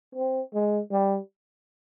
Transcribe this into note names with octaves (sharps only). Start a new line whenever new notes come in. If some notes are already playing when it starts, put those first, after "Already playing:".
C4
G#3
G3